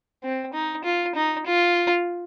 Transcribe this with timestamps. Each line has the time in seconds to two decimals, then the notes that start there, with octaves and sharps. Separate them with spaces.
0.23 C4
0.53 D#4
0.84 F4
1.15 D#4
1.46 F4